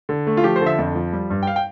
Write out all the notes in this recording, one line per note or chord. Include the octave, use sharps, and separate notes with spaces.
D3
A3
F4
F3 G4
C5
D3 E5
F2
F3
G3
G2
G5
F5
G5